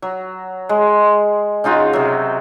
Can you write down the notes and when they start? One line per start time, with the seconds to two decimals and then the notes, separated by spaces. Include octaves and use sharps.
0.02 F#3
0.69 G#3
1.64 C#3 D#4 F4 F#4
1.93 C3 F#3